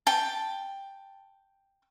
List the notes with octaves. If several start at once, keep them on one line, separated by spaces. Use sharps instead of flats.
G5 A5